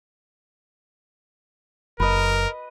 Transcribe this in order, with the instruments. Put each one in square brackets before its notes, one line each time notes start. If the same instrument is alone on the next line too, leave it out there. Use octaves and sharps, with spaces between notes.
[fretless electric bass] F#1 [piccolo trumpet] A#4 [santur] B4 D#5